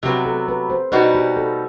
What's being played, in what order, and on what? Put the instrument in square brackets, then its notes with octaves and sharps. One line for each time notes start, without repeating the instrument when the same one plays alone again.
[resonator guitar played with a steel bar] C3 F#3 B3 [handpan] G4
[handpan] A4
B4
C5
[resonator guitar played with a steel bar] B2 G3 D#4 F#4 [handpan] B4
[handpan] G4
A4